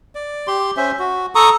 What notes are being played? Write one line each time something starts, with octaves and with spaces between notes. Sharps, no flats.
D5
G4 C6
C#4 C5 E5
F#4
A4 A#5 C#6 D#6